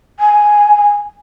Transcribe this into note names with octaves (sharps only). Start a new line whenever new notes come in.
G#5